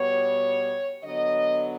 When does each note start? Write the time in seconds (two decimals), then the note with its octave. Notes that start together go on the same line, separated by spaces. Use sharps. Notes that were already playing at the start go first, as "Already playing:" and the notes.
Already playing: B2 G3 B3 C#5
1.03 D3 F#3 B3 D#5